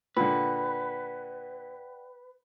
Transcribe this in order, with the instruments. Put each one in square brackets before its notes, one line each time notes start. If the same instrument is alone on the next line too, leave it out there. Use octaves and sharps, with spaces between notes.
[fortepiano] A#2 D3 [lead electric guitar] B4 [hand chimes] D5 F#5 G5